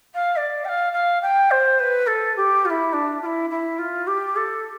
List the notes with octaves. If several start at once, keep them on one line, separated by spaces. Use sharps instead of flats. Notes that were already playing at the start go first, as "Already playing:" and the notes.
F5
D5
G5
F5
F5
G5
C5
B4
A4
G4
F4
E4
D4
F4
E4
E4
F4
G4
A4